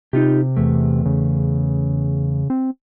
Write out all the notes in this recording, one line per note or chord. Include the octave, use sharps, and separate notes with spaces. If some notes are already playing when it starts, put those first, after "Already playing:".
C3 D#4 F4 G4
E2 A3
C#3
C4